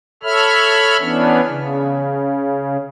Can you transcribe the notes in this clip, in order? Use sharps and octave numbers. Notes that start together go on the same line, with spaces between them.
A4 C#5 E5 B5 F6
E3 B3 C#4 D4
C#3